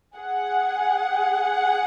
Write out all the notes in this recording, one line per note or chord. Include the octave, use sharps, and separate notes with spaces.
G#4 F#5